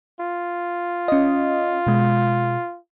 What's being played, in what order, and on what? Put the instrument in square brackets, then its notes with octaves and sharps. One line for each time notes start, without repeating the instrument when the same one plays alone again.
[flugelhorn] F4
[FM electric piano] C#4 D#5
B2 G#3